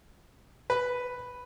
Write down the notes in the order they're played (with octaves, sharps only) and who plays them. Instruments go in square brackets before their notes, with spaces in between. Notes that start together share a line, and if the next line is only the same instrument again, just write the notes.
[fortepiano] B4 B5